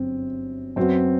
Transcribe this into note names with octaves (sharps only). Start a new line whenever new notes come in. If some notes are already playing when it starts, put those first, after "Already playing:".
Already playing: G1 F#2 C4
F#2 F#3 B3 C4 F#4 B4